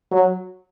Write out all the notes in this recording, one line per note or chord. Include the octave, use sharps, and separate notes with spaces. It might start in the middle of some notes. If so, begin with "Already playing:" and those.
F#3